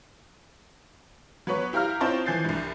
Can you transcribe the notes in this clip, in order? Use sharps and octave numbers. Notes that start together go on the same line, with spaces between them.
F#3 B3 B4 C#5
E4 G4 F5 A#5 F6
C4 E4 F4 C#5 D#5 A5
E3 F3 G#5 G6 A6 C7
C2 G2